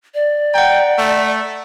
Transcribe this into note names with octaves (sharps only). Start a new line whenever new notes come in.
D5
F#5 G5 A#5
A3